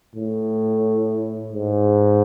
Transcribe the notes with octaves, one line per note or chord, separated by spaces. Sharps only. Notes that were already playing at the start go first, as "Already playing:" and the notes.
A2
G#2